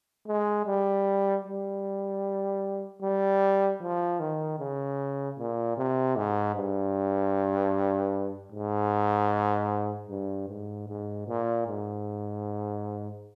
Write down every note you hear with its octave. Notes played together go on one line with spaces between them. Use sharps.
G#3
G3
G3
G3
F3
D#3
C#3
A#2
C3
G#2
G2
G#2
G2
G#2
G#2
A#2
G#2